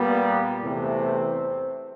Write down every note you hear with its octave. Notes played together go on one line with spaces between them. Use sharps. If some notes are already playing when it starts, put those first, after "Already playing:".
Already playing: A#2 G3 A#3 B3
E2 C3 E3 A3 C4